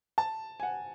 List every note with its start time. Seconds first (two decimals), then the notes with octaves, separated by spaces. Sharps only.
0.18 A5
0.60 G#5
0.63 F#5